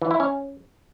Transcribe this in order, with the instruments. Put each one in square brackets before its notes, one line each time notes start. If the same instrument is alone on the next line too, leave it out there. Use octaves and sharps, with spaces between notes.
[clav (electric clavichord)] E3
E4
C#4